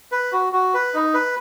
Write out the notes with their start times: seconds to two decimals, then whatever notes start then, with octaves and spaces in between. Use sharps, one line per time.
0.12 B4
0.32 F#4
0.53 F#4
0.74 B4
0.94 D#4
1.14 B4